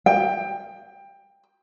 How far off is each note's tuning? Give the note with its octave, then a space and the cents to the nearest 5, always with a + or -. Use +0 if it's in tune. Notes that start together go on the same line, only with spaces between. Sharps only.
G5 +20